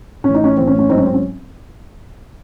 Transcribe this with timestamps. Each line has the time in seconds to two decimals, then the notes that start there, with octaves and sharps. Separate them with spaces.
0.24 A2 E3 C#4
0.34 D#4
0.44 C#4
0.57 A2 E3 C4
0.67 C#4
0.79 C#4
0.89 G#2 F#3 C4 D#4
0.98 C#4
1.06 C4
1.14 C#4